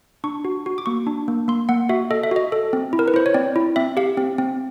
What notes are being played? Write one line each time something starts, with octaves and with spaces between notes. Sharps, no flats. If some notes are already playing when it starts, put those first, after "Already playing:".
D4 C#6
F#4
F#4
D6
A#3 C#6
D4
A#3
A#3 C6
A#3 F#5
F#4 E5
A4 D#5
E5
F#4 D#5
A4
C4
E4
A#4
B4
E4 C5
C#5
C4 D5
E4
C4 E5
G4 F5
C4
C4